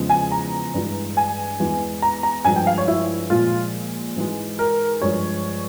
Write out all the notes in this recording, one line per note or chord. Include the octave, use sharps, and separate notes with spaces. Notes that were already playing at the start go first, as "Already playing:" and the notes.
Already playing: E2 C#3 F3 G#3
G#5
A#5
G2 E3 G#3
G#5
E2 E3 G#3
A#5
A#5
G2 F3 G#3 G#5
G5
F5
C#5
E4
A#2 F3 G#3 F4
G#2 E3 G#3
A#4
G2 F3 G#3 C#5